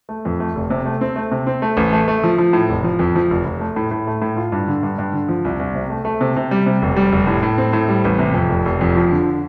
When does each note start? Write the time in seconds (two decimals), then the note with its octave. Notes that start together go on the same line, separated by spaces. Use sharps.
0.09 A3
0.25 F2
0.40 A3
0.55 F1
0.70 C3
0.86 A3
1.01 C4
1.16 A3
1.32 C3
1.47 C4
1.62 A3
1.77 A1
1.93 A3
2.08 A3
2.24 F3
2.38 F3
2.53 A2
2.69 F1
2.84 F3
2.99 F2
3.16 F3
3.30 F1
3.46 F1
3.60 A3
3.76 A2
3.91 A2
4.07 A3
4.22 A2
4.37 F4
4.52 G2
4.67 D3
4.83 G2
4.98 G2
5.13 D3
5.28 F3
5.45 C2
5.59 C2
5.75 C3
5.90 A3
6.05 A3
6.21 C3
6.37 C3
6.51 G3
6.66 C3
6.82 F1
6.96 G3
7.12 F1
7.27 A2
7.43 A2
7.58 C4
7.73 A2
7.89 G3
8.05 A1
8.19 C3
8.34 F2
8.49 F1
8.65 F1
8.81 F2
8.95 F3
9.11 D3